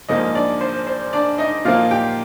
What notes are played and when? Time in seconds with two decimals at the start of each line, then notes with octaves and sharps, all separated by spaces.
0.09 A#1 G#2 F3 A#3 D#4 D#5
0.35 D4 D5
0.61 C5
0.87 C5
1.13 D4 D5
1.38 D#4 D#5
1.65 A#2 F3 A#3 D#4 F4 F5
1.91 G4 G5